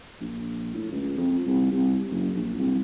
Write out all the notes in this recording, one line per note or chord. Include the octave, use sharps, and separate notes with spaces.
A#1
A2
C#2
F2
C2
C2
F#1
A#1
C2